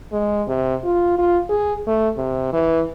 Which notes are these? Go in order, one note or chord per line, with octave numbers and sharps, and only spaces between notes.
G#3
C3
F4
F4
G#4
A3
C3
E3